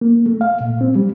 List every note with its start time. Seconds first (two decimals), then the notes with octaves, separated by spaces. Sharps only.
0.01 A#3
0.26 A3
0.41 F5
0.60 A#2
0.81 C4
0.95 G3